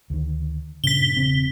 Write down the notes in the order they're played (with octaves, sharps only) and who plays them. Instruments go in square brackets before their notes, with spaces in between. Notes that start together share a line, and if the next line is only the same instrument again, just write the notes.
[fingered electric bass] D2 D#3
[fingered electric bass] G2 A#2 C#3 [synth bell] B6 G7
[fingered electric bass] E1 C#3 C4